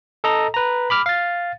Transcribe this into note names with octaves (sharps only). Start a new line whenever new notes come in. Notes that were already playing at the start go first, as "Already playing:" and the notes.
A4 D#5 A#5
B4 A#5
B5 D6 F6
F5 A6